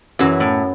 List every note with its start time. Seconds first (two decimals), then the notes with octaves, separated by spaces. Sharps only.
0.19 F#2 E3 F#3
0.40 A2